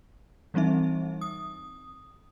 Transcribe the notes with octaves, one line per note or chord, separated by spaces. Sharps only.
E3 G3 C4 D#4 E5
D#6